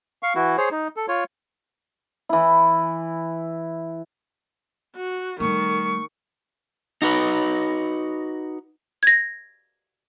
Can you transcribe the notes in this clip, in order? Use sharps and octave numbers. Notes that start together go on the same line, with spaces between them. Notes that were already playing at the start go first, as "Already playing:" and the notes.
F5 C#6
E3 E4 F#4
G#4 C5 C#5
D#4
A4
F4 C#5
E3 E4
F#4
D#3 G3 A3 C#6
D#4 F#4 B4
G#6 A#6